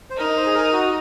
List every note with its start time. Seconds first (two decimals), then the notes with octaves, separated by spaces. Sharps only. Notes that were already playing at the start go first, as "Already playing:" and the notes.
0.10 C5
0.17 D#4 A#4
0.36 C5
0.46 G#4
0.55 A#4
0.73 F#4